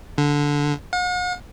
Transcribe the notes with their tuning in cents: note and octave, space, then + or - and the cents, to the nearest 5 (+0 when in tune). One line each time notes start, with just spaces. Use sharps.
D3 -10
F#5 -45